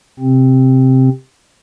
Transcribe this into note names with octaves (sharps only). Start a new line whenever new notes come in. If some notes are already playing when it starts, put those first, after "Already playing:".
C3 C4